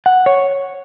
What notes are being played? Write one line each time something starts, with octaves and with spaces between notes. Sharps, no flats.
F#5
C#5